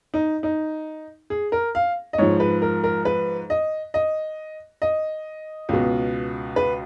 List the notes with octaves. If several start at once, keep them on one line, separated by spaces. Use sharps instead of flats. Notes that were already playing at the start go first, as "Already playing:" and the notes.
D#4
D#4
G#4
A#4
F5
D#5
G#2 F3 C#5
B4
A#4
A#4
B4
D#5
D#5
D#5
C#2 B2
B4